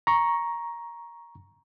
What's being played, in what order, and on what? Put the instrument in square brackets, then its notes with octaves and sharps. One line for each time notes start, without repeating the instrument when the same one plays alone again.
[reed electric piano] A#5 C#6